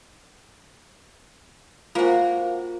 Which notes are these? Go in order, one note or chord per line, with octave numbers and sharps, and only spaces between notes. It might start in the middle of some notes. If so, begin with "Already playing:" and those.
A#3 F4 F#4 C5 G#5